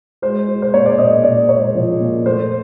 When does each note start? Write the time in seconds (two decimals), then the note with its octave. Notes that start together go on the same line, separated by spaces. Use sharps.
0.22 G#3 C5
0.48 G#3
0.62 C5
0.74 A#2 C#5
0.86 D5
0.98 A#2 D#5
1.24 A#2 D5
1.49 G#3 C#5
1.75 F3
2.00 A#2
2.25 A3 C5